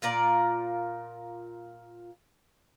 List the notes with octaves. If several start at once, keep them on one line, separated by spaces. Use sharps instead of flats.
A#2 F4 A#4 D5